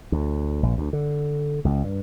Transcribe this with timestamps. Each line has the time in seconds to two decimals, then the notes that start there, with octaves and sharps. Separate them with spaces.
0.12 D2
0.63 A#1
0.78 D2
0.93 D3
1.65 C#2
1.84 G2